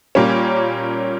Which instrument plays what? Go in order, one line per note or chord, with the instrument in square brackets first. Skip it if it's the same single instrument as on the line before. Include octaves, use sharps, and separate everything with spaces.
[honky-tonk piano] A#2 G3 A#3 C#4